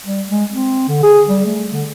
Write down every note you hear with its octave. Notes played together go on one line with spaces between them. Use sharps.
G3
G#3
C4
D3
G#4
G3
A3
D3